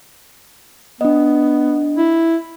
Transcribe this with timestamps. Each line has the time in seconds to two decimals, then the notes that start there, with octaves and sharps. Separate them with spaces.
1.01 B3 D4 D#5
1.97 E4